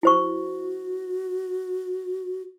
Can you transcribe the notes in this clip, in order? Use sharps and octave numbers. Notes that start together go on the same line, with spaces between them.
E4 F#4 C5 C#6